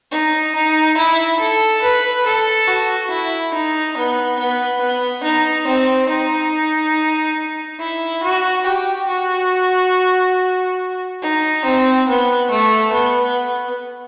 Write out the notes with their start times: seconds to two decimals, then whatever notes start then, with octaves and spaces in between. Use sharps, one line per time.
0.12 D#4
0.55 D#4
0.97 E4
1.39 A4
1.82 B4
2.26 A4
2.67 F#4
3.10 E4
3.53 D#4
3.96 B3
4.39 B3
4.81 B3
5.23 D#4
5.67 C4
6.09 D#4
7.80 E4
8.23 F#4
8.66 G4
9.08 F#4
11.22 D#4
11.65 C4
12.08 B3
12.50 A3
12.92 B3